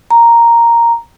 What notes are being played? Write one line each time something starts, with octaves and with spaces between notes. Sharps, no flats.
A#5